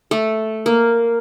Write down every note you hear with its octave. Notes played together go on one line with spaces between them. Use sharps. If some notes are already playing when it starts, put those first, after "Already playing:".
A3
A#3